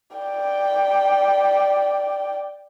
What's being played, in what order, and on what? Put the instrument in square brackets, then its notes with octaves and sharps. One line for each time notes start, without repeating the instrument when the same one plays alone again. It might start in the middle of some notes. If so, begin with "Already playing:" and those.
[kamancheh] D5 G5